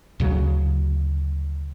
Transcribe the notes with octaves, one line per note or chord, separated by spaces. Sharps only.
D2 C#3 F#3